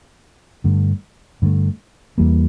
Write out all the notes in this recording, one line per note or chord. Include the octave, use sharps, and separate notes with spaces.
G2 D3 A3
G2 D3 A3
E2 E3 G3 A#3